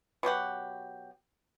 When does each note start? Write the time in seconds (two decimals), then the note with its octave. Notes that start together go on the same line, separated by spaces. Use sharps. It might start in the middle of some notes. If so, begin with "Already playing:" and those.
0.23 B2 F#3 G4 F#5